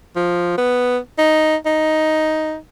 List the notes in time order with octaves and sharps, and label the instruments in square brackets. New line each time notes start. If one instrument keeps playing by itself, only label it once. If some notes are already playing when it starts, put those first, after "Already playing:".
[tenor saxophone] F3
B3
D#4
D#4